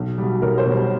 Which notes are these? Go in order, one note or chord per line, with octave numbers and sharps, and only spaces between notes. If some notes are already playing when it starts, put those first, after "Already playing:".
Already playing: B1
B2 G3
B1 A#4
C5
B2
G3 C#5